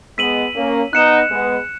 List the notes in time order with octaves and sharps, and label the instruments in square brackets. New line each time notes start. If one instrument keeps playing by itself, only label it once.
[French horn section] G#3 B3 [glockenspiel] E6 B6 D#7 F#7
[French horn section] A#3 C#4
[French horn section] B3 D#4 [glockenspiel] F#6 C#7 E7
[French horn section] G#3 B3